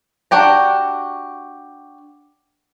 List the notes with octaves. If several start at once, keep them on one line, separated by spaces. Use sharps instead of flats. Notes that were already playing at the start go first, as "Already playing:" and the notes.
D4 F#4 G4 A#5